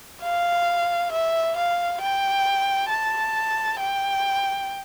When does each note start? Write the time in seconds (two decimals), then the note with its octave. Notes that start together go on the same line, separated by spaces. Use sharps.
0.23 F5
1.12 E5
1.57 F5
2.01 G5
2.90 A5
3.79 G5